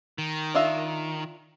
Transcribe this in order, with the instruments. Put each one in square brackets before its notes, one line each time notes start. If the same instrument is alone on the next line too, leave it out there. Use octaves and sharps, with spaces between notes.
[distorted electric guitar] D#3
[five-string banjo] D4 F4 E5